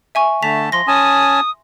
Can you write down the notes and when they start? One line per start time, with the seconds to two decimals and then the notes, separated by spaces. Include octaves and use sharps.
0.15 E5 G#5 C#6
0.42 D3 A3 A5 B6 F7
0.72 F3 C6 A#6
0.88 C#4 G#5 A5 D#6